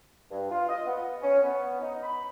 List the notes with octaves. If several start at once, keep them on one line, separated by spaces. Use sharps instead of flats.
G2
F4
D#5
B3
C#4
B3
D#4
B5